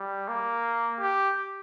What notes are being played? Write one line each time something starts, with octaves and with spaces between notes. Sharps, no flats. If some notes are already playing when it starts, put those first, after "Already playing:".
Already playing: G3
A#3
G4